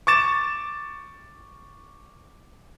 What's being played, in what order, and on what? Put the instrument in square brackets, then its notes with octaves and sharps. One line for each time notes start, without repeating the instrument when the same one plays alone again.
[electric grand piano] C#6 D6 A6 E7